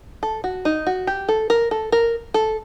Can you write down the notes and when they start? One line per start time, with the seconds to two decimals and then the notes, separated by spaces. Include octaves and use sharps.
0.23 A4
0.44 F#4
0.65 D#4
0.87 F#4
1.07 G4
1.28 A4
1.50 A#4
1.71 A4
1.92 A#4
2.34 A4